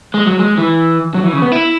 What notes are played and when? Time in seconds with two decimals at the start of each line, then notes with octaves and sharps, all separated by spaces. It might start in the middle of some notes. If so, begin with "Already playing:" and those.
0.14 G#3
0.27 F#3
0.39 G#3
0.58 E3
1.14 F#3
1.23 E3
1.33 C#3
1.42 B3
1.52 E4